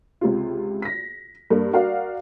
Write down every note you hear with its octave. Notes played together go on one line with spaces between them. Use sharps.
C#2 C3 F4
A#6 B6
G2 A#3
F#4 A#4 D5 F5